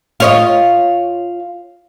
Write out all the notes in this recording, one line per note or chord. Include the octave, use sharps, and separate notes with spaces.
F4 C#5 D#5